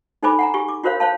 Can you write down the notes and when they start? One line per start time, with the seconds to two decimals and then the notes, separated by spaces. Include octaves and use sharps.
0.23 D#4 A4 C5 G#5 B5 D6
0.39 F#5 G#5 A#5
0.54 G4 G#5 C#6
0.68 D6
0.84 F4 F#4 A#4 C5 C#5 F5
1.00 C5 C#5 F5 A5